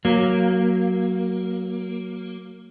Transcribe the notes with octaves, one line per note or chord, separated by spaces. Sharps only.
F#3 A#3